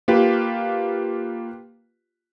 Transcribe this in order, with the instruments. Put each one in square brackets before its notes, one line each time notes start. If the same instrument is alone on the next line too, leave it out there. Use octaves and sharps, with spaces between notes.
[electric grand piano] A#3 F4 G4 B4